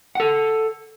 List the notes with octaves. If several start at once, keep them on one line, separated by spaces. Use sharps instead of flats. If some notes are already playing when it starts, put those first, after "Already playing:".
A4 F#5